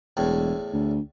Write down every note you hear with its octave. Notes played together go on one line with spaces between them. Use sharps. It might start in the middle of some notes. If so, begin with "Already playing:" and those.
E1 E2 A2
D2